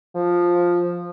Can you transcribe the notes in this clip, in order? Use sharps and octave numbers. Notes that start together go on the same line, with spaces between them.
F3